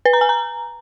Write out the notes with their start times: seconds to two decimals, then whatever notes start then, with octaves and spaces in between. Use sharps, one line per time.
0.05 B4
0.13 A#5
0.21 G#5
0.29 A#5